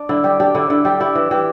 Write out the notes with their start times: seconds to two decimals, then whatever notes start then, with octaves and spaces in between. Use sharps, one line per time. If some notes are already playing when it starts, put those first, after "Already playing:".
Already playing: D4
0.09 D3 E4
0.24 G3 G4
0.40 D4 G4
0.55 D3 E4
0.70 D3 E4
0.85 G3 G4
1.00 E4 G4
1.15 E3
1.31 E3 G4